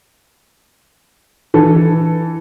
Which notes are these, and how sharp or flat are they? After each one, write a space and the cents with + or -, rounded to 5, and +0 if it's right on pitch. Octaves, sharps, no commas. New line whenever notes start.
E3 +0 A4 +0